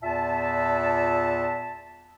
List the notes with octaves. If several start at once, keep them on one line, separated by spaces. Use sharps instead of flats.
E2 A#2 F4 E5 A5